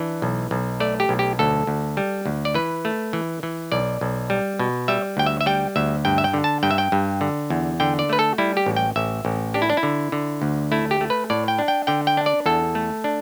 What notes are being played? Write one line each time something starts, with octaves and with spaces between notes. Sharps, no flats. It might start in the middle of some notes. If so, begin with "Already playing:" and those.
Already playing: E3 D4
B1
B1
A3 D5
G4
B1
G4
D2 A4
D2
G3
D2
D5
E3 B4
A3
E3
E3
B1 D5
B1
G3
B2
G3 E5
D2 G5
E5
E5
G3 G5
D2 E5
G2 G5
E5
G5
D3
A5
G2 G5
E5
G5
G2
D3
E2
D3 G5
D5
A3 B4
A4
G3 E4
G4
A1
G5
A1 E5
A1
D4 G4
E4
D4
E4
D3
D3
D2
A3 E4
G4
A3
B4
A2 D5
G5
D4
G5
D3 G5
G5
D4
D5
E2 A4
A3
D4